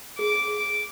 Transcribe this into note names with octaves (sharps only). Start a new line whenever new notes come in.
G#4 D6